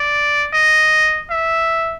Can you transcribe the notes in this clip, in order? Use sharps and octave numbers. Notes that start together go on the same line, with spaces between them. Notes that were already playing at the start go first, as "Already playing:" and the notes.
Already playing: D5
D#5
E5